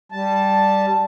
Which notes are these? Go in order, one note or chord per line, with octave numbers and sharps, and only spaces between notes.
G3 A5